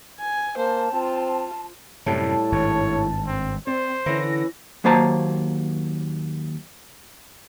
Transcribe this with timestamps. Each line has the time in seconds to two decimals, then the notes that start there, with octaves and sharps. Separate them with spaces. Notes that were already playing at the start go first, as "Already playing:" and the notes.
0.20 G#5
0.57 A#3 C5 A5
0.92 C4 F4
2.06 F#2 A2 C3 G3 A5
2.52 G#1 G2 C#5
3.27 C4
3.67 C4 C5 D5
4.06 D3 E3 C#4 A#6
4.84 D#2 F#3 A#3 C5 A5 A#5